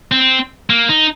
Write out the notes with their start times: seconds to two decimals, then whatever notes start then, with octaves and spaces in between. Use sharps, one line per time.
0.12 C4
0.70 A#3
0.89 D#4